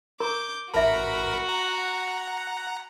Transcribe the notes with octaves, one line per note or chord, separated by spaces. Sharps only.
A#4 A#5 C#6 D6 G6
A1 F#4 A#4 E5 A5 B5
F#5 A#5